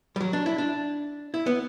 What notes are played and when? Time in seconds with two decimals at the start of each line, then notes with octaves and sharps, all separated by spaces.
0.16 G3
0.20 F#3
0.33 D4
0.46 E4
0.58 D4
1.34 E4
1.46 B3